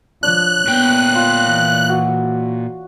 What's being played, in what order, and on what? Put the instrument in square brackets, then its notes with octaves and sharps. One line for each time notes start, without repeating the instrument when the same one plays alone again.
[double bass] F3 [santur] D4 C#5 [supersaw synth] F#6
[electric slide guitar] A#2 G5 [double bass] B3
[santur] F4
[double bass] E3
[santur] F#4 F#5